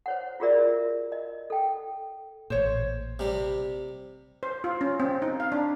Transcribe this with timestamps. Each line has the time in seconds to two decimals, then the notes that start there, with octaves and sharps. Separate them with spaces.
0.06 C5 C#5 F#5
0.40 F4 F#4 G#4 A#4 D5 E5
1.12 D#5
1.50 A4 G5
2.50 A1 A#2 C5 C#5
3.19 C3 G3
4.43 C5
4.64 F4
4.81 C#4
5.00 C4
5.22 D#4
5.40 F5
5.52 D4